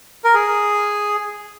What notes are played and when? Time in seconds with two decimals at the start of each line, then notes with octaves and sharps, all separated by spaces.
0.24 A#4
0.34 G#4